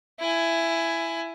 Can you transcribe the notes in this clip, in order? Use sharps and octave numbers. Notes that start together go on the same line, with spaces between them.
E4 G#5